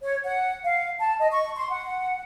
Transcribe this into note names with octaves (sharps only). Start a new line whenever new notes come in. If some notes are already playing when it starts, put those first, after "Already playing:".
C#5
F#5
F5
A5
D#5
C#6
C6
F#5